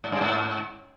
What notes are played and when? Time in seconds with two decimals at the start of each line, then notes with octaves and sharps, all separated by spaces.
0.04 G#2
0.12 G2
0.21 G#2